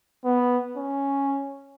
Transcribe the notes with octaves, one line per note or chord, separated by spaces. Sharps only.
B3
C#4